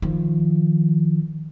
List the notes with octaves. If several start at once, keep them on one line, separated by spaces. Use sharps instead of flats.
D#3 F3